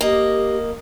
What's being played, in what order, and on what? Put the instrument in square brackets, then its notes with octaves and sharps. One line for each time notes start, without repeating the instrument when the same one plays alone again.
[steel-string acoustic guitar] A#3 D#5 [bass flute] G4